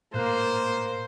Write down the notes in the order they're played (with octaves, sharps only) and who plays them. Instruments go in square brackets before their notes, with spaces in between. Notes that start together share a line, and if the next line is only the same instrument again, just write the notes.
[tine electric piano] A2 F#6 [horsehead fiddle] A#3 [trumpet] C5